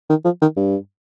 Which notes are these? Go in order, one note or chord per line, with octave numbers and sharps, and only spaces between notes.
D#3
F3
D#3
G2